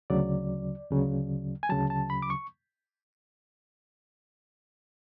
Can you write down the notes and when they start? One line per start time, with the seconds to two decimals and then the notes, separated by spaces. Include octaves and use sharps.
0.10 D2 C#3 F#3 D5
0.90 D2 C#3 F#3
1.63 G#5
1.70 D2 C#3 F#3 A5
1.90 A5
2.10 B5
2.22 D6
2.30 C#6